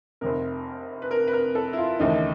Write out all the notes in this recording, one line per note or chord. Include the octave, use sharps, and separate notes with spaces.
F1 F2 C3 A#4
B4
A#4
B4
A#4
A4
E4
F4
D#2 C#3 E3 A3 D#4